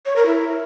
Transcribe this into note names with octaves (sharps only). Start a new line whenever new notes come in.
C#5
A#4
E4